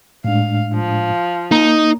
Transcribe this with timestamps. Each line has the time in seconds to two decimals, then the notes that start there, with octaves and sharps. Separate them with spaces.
0.24 A2 G#3 D4 F5
0.74 F3
1.51 A#3 D#4 A#5